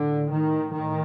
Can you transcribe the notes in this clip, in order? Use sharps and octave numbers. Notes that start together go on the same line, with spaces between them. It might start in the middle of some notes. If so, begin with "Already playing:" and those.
Already playing: A2 D3
D#3
A2 D#3